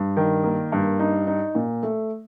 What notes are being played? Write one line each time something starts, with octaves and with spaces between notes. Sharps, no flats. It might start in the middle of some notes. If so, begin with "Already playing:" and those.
Already playing: G2
D#3
A#3
G2
D#4
D#4
A#2
A3